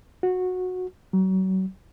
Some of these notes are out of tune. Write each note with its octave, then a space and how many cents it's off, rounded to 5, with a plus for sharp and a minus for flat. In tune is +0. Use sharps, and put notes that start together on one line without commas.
F#4 -15
F#3 +35